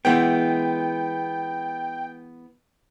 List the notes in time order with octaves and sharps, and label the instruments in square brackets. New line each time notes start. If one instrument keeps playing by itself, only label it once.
[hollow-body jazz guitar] E3 G#3 B3 [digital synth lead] G5